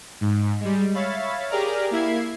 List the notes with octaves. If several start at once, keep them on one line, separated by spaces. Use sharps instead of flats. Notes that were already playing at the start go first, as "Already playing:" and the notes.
G#2
G3 G#3
C#5 E5 F5 B5 A6
G4 G#4 A#4 D5 A#5 F6
A#3 E4 E5 G#6 C7